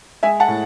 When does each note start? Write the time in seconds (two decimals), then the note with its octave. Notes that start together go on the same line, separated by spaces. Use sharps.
0.23 G#3 E5 G#5
0.40 F#5 A5
0.48 A2